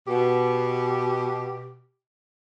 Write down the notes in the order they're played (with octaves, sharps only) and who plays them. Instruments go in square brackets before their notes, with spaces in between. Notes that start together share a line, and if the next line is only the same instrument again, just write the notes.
[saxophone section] B2 [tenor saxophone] G4